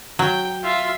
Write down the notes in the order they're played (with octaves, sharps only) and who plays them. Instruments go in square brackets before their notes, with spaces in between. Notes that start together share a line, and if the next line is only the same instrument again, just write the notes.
[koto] F#3 [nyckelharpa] G5
[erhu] F4 [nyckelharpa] E5